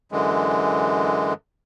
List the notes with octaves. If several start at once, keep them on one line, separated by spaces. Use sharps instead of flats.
F#2 D3 E3 G#3